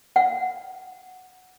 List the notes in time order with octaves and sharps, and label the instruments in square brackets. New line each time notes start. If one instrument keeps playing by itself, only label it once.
[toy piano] F5 F#5